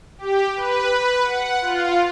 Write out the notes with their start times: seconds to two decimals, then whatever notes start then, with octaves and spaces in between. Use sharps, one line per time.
0.18 G4
0.55 B4
1.23 F#5
1.61 F4